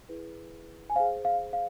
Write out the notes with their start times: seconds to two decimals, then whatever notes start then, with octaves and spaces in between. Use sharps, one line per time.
0.09 E4 G#4 B4
0.90 G#5
0.96 C5 F5
1.00 G#4
1.25 F5
1.53 F5